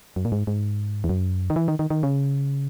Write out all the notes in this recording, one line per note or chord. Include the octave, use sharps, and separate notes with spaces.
F#2
A#2
G#2
G#2
E2
F#2
D#3
E3
D#3
D#3
D#3
C#3